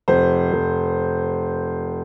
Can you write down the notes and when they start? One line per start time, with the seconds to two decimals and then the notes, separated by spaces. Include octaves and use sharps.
0.08 F1 C5
0.53 F1